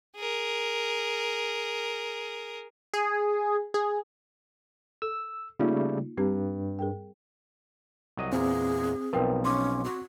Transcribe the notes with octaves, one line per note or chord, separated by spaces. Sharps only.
G#4 A#4
G#4
G#4
A4 E6
C#3 G3 A3 A#3 D#4 F4
G2 G3 C4 G4
G#4 A#4 G5
C2 F#3 D#5
E2 A#2 C4 G#4
B1 F3 A#4 B4 G5
C#4 C6 D6
F#4